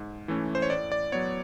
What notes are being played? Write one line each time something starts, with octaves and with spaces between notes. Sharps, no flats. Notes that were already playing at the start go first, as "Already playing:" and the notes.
Already playing: G#2
E3 A3 C#4
C5
C#5
A2 D5
D5
F#3 B3 C#5